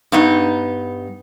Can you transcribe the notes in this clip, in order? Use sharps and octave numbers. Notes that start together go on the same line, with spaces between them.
G2 B3 D#4